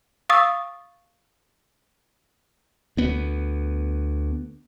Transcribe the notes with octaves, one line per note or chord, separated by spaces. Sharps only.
F5 C#6 D#6 E6 A6
D2 B3